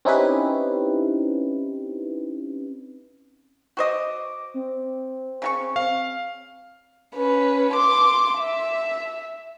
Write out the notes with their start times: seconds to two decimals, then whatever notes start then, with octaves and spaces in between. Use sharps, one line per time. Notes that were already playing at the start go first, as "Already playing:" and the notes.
0.05 C4 C#4 D#4 E4 G4 B4
3.77 F#4 C5 D#5 D6
4.54 C4
5.42 C#3 F#4 C#6
5.76 F5
7.15 C#4 B4
7.73 C6 D6
8.39 E5